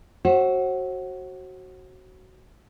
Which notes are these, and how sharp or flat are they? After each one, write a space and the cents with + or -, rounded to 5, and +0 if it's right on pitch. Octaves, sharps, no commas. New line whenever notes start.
F#4 +10 C5 +45 E5 +0